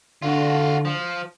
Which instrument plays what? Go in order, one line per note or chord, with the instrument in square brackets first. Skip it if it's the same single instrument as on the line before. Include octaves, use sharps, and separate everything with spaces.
[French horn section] D3 [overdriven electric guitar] F4 F#4
[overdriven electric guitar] F3